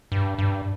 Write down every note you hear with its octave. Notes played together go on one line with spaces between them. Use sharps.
G2
G2